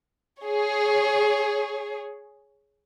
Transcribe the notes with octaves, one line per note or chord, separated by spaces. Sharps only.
G#4 C#5